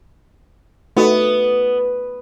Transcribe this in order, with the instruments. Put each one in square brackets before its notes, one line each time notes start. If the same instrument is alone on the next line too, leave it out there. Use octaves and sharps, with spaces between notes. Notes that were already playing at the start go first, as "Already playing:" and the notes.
[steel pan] A3 D#4 F#4 [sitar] B3